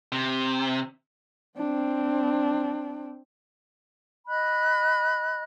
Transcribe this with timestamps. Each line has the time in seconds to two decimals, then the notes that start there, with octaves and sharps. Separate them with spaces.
0.12 C3
1.58 C4 D4
4.28 D#5 B5 F#6